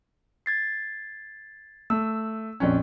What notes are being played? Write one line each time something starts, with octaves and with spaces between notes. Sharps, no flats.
G#6 A6 C7
A3 E6
A#1 F2 C#4